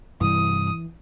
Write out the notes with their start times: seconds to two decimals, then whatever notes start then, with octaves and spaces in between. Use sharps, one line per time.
0.21 G2 C3 E3 G3 D#6